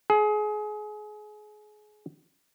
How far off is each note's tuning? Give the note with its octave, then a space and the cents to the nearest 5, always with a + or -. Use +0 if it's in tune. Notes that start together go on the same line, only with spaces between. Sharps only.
G#4 +30